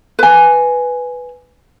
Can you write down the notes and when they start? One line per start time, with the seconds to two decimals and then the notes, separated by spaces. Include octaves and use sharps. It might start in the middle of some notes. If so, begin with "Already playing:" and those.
0.19 B4 G#5